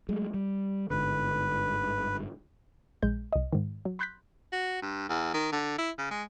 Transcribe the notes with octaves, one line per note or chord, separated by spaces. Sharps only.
F#3 G#3 A3
G3
G1 G#2 D3 B4
A#1 G#3 G6
C2 D#5
G#2 D#3
F#3
B5 C6 F#6 G6 A6 B6
F#4
G2
E2
D#3
D3
E4
C#3
G#3